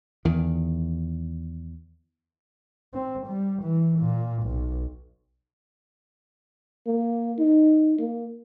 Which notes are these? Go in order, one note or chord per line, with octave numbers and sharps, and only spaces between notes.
E2 D#3
C4
G3
E3
A#2
B1
A#3
D#4
A#3